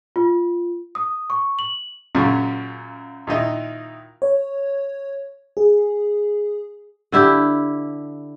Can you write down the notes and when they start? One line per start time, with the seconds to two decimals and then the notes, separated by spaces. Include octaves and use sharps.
0.16 F4
0.95 D#6
1.30 C#6
1.59 F#7
2.15 F#2 A#2 C#3
3.27 A#2 D#3 D#4 E4
4.22 C#5
5.57 G#4
7.12 D3 E4 G4